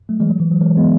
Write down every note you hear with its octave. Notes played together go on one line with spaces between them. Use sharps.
F#3 A3
E3 G#3
F#3
E3
F#3
E3 G#3
G#3 B3